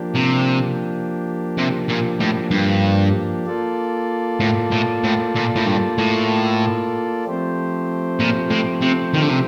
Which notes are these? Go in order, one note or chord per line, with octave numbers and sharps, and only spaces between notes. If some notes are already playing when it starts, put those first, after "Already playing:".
Already playing: F3 A#3 D4 G4
C3
C3
A#2
A2
G2
A#3 F4 A4 D5
A2
A2
A2
A#2
A2
G2
A2
F3 A3 C4 G4 C5
A#2
A2
C3
D#3
D3
C3